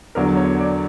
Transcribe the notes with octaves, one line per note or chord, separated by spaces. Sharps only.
E2 D3 F#3 A#4
C#5
D5